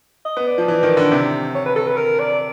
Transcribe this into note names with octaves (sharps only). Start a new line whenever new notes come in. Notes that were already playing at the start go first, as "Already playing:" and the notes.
D#5
B3
D5
F3
E3
D#3
D3
C3
C#5
B4
A4
B4
A#4
D5